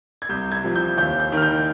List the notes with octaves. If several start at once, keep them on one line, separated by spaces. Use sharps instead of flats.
G#6
C2 G6
G#6
C3 F3
G6
D#2 G6
G6
D#3
F6
G6